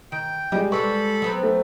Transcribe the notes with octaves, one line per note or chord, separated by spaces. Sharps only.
D#3 G5
G3 G#3 D#5
G3 G#3 A4 B4 B5 C#6
F#3 B3 C4
A3